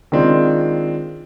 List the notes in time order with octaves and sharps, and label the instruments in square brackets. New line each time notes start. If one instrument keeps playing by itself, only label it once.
[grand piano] D#3 G#3 C4 D4 F4